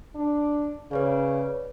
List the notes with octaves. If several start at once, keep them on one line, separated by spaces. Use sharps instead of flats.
D4
C#3 B4 C#5 D5